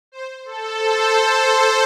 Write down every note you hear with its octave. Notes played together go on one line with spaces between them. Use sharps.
C5
A4
C5
C5